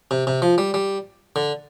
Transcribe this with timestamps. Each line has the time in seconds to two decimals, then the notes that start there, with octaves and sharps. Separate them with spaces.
0.11 C3
0.27 C3
0.42 F3
0.58 G3
0.74 G3
1.36 D3